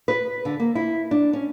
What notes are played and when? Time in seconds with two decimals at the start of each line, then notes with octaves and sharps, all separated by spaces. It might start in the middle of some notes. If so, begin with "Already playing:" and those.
0.08 B4
0.45 D3
0.60 A#3
0.75 E4
1.11 D4
1.33 C#4